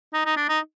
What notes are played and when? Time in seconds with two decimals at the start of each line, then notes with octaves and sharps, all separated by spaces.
0.13 D#4
0.25 D#4
0.37 D4
0.49 D#4